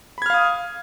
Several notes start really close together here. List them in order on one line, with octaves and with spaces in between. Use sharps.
B5 G#6 F6 F5 D#6